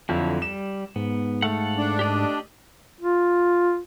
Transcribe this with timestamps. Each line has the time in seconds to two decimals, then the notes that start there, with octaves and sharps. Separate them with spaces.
0.09 F2 D3 F#3 E4
0.42 G3 E7
0.96 G#2 B3
1.42 A3 A4 F5 F#5
1.78 D4
1.99 G4 D5 D#5
3.01 F4